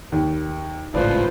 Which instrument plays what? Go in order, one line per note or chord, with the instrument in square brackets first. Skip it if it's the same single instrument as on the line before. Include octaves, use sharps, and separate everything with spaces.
[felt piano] D#2
[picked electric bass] G#1 C#2 A2 [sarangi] F3 [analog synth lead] B4 [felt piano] D5